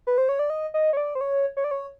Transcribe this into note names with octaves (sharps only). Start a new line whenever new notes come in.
B4
C5
C#5
D5
D#5
D#5
C#5
D5
C5
C#5
C#5
D5
C#5